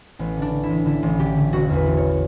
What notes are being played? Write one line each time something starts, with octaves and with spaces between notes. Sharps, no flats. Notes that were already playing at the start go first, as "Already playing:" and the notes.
A1 B3
D3
D4
D3
E4
A1
D3 E4
A1
D3 G4
D3
E1 F#4
E2
B4
E1
C#5